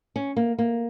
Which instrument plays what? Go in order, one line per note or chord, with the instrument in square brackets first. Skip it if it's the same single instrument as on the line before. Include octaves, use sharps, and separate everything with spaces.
[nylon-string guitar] C#4
A#3
A#3